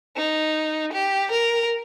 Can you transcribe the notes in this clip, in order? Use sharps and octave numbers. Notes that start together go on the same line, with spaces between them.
D#4
G4
A#4